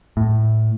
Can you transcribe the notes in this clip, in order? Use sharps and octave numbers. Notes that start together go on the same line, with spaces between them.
A2